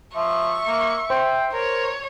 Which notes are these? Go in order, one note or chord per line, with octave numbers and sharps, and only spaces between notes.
F3 E5 C#6
A#3
C5 G5 C6
A#4 C#5